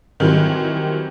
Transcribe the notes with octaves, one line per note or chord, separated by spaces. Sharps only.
D#3 E3 F#3 G3 C4